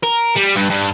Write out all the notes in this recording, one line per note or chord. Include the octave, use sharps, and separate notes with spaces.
A#4
G3
G2
G2